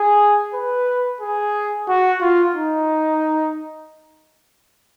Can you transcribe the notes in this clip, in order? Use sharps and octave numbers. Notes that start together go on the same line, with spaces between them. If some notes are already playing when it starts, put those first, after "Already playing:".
Already playing: G#4
B4
G#4
F#4
F4
D#4